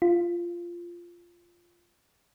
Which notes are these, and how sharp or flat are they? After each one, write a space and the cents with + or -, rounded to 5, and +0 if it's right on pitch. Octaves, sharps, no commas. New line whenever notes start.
F4 -10